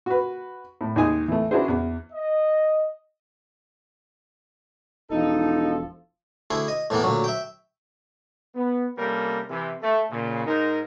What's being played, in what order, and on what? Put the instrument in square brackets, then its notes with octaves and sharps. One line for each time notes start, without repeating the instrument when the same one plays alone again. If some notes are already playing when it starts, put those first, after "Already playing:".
[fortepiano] F#4 B4
A2
D#2 G#3 D#4 G#5 D#6
E3 A3
C#4 D4 E4 F#4 G#4 C5
E2
[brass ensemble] D#5
[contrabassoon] E1 [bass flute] F3 [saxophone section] D#4 [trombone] A4
[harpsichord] D2 E4 G#4
D#5
A2 E3 A#3 B3
D2 A#2 F#3
E5 G5
[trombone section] B3
C3 G3 A#3 C#4 A4 A#4
C3 E3
A3
A#2 C#3
G#2 D#4 A#4